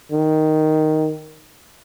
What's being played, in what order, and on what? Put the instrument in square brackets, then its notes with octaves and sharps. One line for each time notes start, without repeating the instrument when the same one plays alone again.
[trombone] D#3